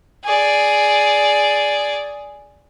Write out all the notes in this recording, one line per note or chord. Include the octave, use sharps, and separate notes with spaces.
G#4 D5